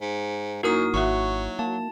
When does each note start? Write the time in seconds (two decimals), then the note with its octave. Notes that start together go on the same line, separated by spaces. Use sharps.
0.02 G#2
0.63 F#2 A#3 D#4 E4 F#4 A#4 D#6
0.94 G#1 F#3 F#4 E5 F#5 C#6
1.59 A#3 A5